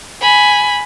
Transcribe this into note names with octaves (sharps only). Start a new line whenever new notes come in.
G#5 B5